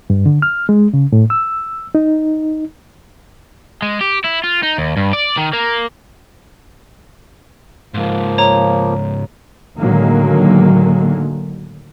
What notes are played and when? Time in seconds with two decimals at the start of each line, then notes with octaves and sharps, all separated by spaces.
0.10 G2
0.26 D3
0.42 F6
0.69 G#3
0.93 C#3
1.12 A2
1.30 E6
1.95 D#4
3.82 G#3
4.01 G4
4.25 E4
4.44 F4
4.63 D#4
4.78 D#2
4.97 G2
5.13 D5
5.37 D#3
5.53 A#3
7.94 C#2 G#2 F3 A#3
8.38 C#5 A#5
9.79 A2 D3 D#3 F#3 G#3 A#3